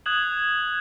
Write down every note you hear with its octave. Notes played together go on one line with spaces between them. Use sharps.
D#6 F#6 G#6 E7 F#7